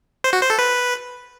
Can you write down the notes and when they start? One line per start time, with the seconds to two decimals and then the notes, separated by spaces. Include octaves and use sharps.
0.24 C5
0.33 F#4
0.41 C5
0.50 A4
0.59 B4